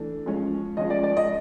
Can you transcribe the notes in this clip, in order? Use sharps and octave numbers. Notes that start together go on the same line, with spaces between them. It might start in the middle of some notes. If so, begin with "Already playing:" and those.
Already playing: E3 A3 D4
F3 G#3 C#4
F3 G#3 C#4 D#5
D5
D5
D#5